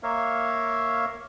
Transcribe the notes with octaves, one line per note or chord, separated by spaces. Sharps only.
A#3 A#4 C#5 E5 F5